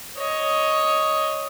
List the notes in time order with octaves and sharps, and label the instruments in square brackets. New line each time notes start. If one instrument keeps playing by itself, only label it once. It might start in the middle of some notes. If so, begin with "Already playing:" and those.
[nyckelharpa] C#5 D#5